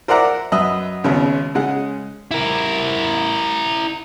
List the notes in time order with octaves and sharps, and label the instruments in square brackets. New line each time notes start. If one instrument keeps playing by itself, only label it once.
[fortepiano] A#4 C5 D5 E5 F#5 A#5
F#2 B4 D#5 E5 B5
G#1 D#2 C#3 B3
C#3 G#3 F#5
[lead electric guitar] E4 A#4